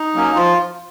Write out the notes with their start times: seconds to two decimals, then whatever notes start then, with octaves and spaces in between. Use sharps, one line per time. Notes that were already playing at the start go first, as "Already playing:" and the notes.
Already playing: D#4
0.15 F#3 A#3 C#4
0.35 F3 F4